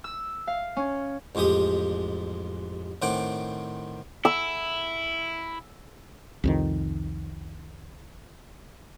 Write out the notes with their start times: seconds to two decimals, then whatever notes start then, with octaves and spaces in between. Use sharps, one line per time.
0.04 E6
0.47 F5
0.77 C#4
1.35 A1 F2 G#3 G4 D#6
3.02 A2 D#3 C4 F#5 G5 D6
4.25 E4 E6
6.44 C2 F2 D#3